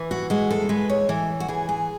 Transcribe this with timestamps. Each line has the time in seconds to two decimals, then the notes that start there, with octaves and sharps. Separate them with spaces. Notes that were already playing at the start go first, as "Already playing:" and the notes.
Already playing: E3
0.11 F#4
0.30 G#3 F#4
0.51 A4
0.69 G#3 B4
0.90 C#5
1.09 E3 A4
1.40 F#4
1.48 E3 G#4
1.69 G#4